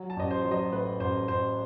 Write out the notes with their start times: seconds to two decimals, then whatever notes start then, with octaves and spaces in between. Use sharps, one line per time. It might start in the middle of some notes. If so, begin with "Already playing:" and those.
Already playing: F#3
0.10 A5
0.17 A1 D#5
0.31 C5
0.42 F#3 C5
0.51 D#5
0.72 A2 B4
1.00 A1 C5
1.28 A1 C5